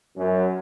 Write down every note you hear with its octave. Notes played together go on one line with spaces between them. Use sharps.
F#2